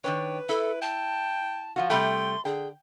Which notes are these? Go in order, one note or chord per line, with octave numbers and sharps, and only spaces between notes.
D#3 D4 B4 C#5 G5
E4 A4
G5 A5
F3 F4 F#4
C3 G3 A3 G5 C6
D3 G#4 G5